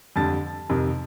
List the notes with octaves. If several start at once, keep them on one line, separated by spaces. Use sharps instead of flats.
F2 D3 G3 A5 A6
F2 C3 D#3